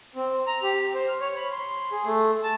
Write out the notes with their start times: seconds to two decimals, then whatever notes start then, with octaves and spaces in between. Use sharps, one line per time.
0.15 C4
0.47 A#5
0.62 G4
0.94 C5
1.08 F6
1.20 C#5
1.37 B5
1.52 C6
1.92 G#4
2.05 A3
2.43 A5